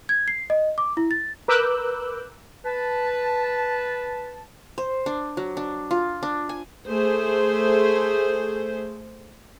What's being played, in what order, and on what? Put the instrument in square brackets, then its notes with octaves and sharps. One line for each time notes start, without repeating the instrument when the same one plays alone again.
[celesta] G#6
C7
D#5
D6
E4
A6
[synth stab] A#4 B4 D6 E6 F#6 G6
[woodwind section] B4 A5
[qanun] C5
D4
F#3
D4
F4
D4
G#5
[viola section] A3 G#4 C5